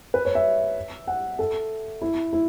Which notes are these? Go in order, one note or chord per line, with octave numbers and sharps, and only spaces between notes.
B4
C#5
E5
F#5
A4
E4
E4